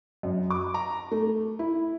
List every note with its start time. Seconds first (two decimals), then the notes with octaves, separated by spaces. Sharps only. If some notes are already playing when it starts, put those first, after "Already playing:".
0.23 F#2
0.50 D6
0.74 A#5
1.11 A3
1.59 E4